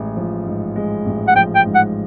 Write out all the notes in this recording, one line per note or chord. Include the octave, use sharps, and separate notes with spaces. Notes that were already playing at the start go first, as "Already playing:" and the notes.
Already playing: A1 G#3
F3
G#2
G#3
A1
F#5
F3 G5
G5
G#2
F#5